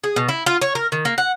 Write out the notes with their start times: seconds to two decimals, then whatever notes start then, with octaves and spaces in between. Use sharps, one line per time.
0.04 G#4
0.16 B2
0.29 E4
0.46 F4
0.62 C#5
0.75 A#4
0.92 D#3
1.05 A#3
1.18 F#5